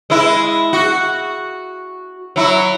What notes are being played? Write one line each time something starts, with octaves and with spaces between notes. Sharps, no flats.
G#3 E4
F#4
F#3 E4